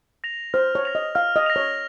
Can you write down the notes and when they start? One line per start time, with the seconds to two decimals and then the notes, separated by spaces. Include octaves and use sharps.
0.24 A#6 F7
0.54 C5 F6
0.75 C#5
0.85 A#6 F7
0.95 D#5
1.15 F5 F6
1.36 D#5
1.46 A#6 F7
1.56 C#5